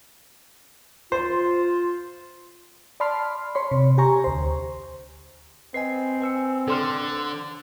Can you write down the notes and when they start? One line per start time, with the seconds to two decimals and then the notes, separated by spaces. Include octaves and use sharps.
1.12 F4 C5
3.00 D5 A5 B5 C6 F6
3.55 C#5 B5 C6
3.71 C3
3.98 G4 G#5 A#5 C#6
4.24 D2 C5
5.74 C4 B4 D#5 G#5 C7
6.22 B4 G#5 E6 C#7
6.68 D3 A4 C6 F6